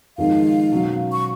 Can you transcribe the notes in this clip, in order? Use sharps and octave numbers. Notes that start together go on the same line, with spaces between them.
F2 D#3 G#3 D#4 A#4 F5
B2 F#3 C#4
C#6